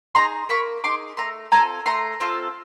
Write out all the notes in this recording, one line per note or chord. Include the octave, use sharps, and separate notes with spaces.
D#4 G#4 A#5 C6
A#3 B5 C#6
D#4 G#4 C6 D6
A3 A#5 C6
C4 F4 A4 G#5 A#5
A3 A#5 C6
C4 F4 A4